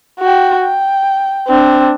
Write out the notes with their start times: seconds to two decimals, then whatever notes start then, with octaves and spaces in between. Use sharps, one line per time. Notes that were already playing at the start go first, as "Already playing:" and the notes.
0.20 F#4 G5
0.61 G5
1.47 C4 D4